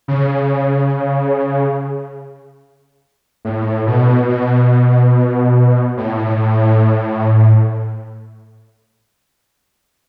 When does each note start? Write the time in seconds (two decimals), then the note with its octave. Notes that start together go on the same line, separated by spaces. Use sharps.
0.08 C#3
3.45 A2
3.87 B2
4.29 B2
5.97 A2